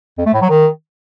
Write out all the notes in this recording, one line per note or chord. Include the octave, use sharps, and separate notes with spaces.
F2
A3
A2
F#3
D#3